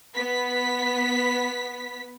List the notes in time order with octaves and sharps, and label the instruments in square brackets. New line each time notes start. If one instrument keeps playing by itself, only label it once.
[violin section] B3 B6